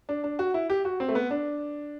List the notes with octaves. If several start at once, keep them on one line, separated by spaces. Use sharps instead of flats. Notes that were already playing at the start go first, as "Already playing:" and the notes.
D4
D4
F#4
E4
G4
F#4
C4
A3
B3
D4